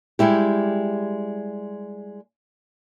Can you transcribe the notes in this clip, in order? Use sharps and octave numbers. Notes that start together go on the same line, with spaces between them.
G3 G#3 E4 G4